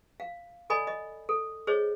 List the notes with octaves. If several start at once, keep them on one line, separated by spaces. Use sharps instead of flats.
F5
A4 D5 D#5 G#5 B5
D#5
A4
G#4 C5 C#5 D#5